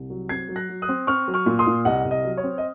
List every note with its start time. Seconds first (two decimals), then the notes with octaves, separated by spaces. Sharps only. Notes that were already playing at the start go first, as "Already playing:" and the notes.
Already playing: C2
0.10 F#3
0.29 C4 G#6 C7
0.49 F#3
0.56 F#6 A#6
0.69 F#3
0.82 D#6 F#6
0.89 C4
1.07 C4 C#6 F6
1.28 F#3
1.34 C#6 F6
1.46 A#2
1.59 C6 D#6
1.67 A#2
1.85 C2 D#5 F#5
2.05 C2
2.11 D#5
2.24 F#3
2.37 C#5
2.44 C4
2.58 D#5